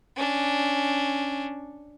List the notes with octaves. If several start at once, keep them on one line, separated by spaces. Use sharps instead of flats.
C#4 D4